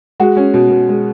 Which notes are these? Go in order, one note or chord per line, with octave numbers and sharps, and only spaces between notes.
G#3 F#4
C#4
B2
B2
G#3